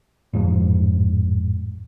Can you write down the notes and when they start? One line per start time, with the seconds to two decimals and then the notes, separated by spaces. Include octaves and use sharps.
0.33 A1 F2 G#2 F3